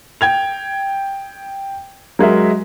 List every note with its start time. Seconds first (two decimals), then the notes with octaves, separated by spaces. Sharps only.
0.21 G5 G#6 F7
2.19 F#3 G#3 A#4 E5